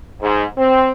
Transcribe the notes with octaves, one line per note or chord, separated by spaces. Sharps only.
G#2
C4